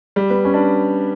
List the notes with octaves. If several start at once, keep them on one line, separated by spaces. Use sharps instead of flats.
G3
B3
C#4
D4